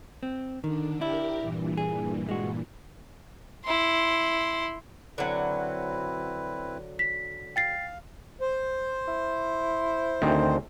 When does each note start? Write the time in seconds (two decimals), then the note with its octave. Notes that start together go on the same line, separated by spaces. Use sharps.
0.23 C4
0.64 D3 D#3 D4
1.01 D4 E4 G4 A#4
1.40 G2 A#2 E3
1.77 G#4
2.29 G#3 F#4
3.65 E4 C6
5.18 D3 F#3 C4 E4 B4
6.99 B6
7.56 F5 G5 A6 C7
8.41 C5
9.08 E4
10.22 D2 D#3 C4